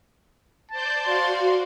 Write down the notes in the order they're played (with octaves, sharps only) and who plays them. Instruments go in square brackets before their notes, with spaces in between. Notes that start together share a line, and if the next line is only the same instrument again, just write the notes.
[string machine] C5 D5 G6 [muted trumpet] A5
[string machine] F#4 [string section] D5 F5 C6